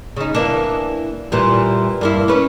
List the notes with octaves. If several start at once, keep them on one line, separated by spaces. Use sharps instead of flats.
C#3 D#4
E3 A#3 D4
A#2 E3 G3
G2 A#3 E4
C#4 B4